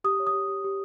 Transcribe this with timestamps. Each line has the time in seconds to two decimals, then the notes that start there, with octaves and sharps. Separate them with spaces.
0.04 G4 D#6
0.20 C#5
0.27 D#6
0.33 G4
0.48 G4
0.64 G4